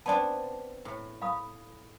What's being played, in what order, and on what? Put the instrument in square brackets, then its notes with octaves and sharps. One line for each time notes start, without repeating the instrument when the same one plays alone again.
[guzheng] B3 C4 D4 [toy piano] D5 A5
[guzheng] A2
[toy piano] F5 B5 D#6